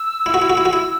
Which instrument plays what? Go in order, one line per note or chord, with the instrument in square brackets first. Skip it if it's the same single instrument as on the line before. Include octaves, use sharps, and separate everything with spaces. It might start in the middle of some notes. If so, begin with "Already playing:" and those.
Already playing: [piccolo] E6
[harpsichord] E4
F#4
E4
F#4
E4
F#4
E4